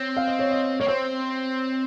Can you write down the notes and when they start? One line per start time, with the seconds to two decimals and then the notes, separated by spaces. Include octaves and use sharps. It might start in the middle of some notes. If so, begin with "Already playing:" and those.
Already playing: C4 C#5
0.17 F5
0.27 D#5
0.39 C#5
0.51 D#5
0.80 A#3 C#5
0.88 C4 C5